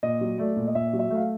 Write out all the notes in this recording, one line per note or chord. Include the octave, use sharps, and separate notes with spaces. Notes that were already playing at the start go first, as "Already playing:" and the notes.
A#2 D#5
F#3
A3 D5
A#2
D#5
A#2 E5
F#3
E5
A3 F5